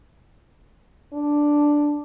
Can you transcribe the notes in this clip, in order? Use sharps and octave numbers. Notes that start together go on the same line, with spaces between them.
D4